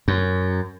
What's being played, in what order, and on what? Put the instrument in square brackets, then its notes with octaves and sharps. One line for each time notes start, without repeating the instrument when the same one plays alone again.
[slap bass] F#2